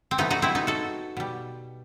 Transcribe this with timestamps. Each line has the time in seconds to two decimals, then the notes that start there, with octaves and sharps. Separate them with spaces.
0.11 C4
0.18 C3 E3 A3 B3 D#4
0.31 D#4 F#4
0.42 C4 E4
0.55 B3 D#4
0.67 F#4 A4
1.17 B2 G3